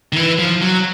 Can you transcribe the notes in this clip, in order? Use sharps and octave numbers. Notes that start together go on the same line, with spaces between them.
D#3
E3
F3
F#3